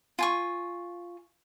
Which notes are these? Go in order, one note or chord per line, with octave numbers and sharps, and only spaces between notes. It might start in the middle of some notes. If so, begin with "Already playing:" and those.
F4 G#5 C#6